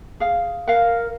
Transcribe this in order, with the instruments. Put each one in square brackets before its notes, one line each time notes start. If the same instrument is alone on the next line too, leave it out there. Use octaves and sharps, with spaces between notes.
[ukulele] G#4 F5
[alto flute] A#4 [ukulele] F5 F#5